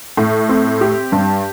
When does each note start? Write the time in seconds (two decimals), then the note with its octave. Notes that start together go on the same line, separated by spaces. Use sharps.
0.17 A2
0.49 C4
0.81 G4
1.12 G2